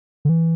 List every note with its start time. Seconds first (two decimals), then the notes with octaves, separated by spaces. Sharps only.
0.25 D3
0.29 E3